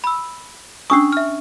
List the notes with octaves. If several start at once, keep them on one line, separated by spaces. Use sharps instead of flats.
B5 E6
C#4 D4 C#6 D#6 E6 C7
E5 F6